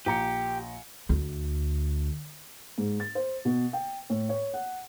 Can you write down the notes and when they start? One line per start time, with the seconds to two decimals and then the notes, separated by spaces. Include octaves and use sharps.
0.06 A#1 G4 A#5 C#7
1.09 D2
2.78 G#2
3.00 A6
3.15 C5
3.45 B2
3.73 G5
4.10 A2
4.29 C#5
4.54 F#5